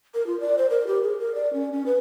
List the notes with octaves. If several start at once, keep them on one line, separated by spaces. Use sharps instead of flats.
A#4
F4
D5
C5
A#4
G4
G#4
A#4
D5
C#4
C#4
B4